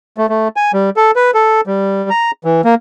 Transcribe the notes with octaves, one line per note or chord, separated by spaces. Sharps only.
A3
A3
G#5
G3
A4
B4
A4
G3
A#5
E3
A#3